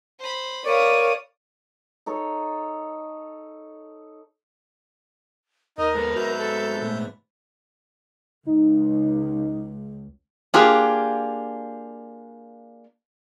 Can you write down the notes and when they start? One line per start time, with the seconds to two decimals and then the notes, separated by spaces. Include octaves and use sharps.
0.19 C5 B5
0.65 A#4 B4 C#5 D5 F5 D#6
2.06 D#4 A4 C#5
5.78 D#2 D#4 A#4 D#5
5.95 G#2 B3 A4 B4
6.16 F#4 E5 A#5 G6
6.38 A4
6.82 A#2 A3
8.46 C#2 D#4
10.54 A#3 D4 F4 G4 G#4